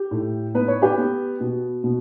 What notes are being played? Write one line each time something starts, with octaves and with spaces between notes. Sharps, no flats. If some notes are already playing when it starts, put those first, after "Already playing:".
Already playing: G4
A2
B3 B4
C#5
G4 B4
B3
B2
B2